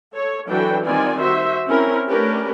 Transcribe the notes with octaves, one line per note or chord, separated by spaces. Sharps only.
A4 C#5
E3 F#3 D4 F#4 A4 G5
D#3 G3 C4 F4 D5 G#5
F#4 C5 E5
C4 C#4 E4 A#4
A3 C#4 D4 G4 A#4 B4